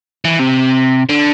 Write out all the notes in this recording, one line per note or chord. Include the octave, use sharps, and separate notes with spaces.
E3
C3
D3